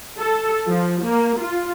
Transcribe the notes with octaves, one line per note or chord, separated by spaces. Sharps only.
A4
F3
A#3
F4